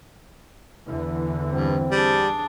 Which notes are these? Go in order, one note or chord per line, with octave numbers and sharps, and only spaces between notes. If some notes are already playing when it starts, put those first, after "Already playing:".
E2 D3 E3
G2 C4
G3 D4 G#4